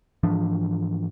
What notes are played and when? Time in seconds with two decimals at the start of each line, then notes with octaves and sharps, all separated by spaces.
0.23 G#2 E3 F3 D4